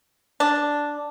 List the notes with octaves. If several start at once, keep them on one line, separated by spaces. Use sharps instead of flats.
D4